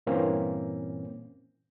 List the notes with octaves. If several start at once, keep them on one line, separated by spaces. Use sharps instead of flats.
G2 A#2 E3 A#3 C4 C#4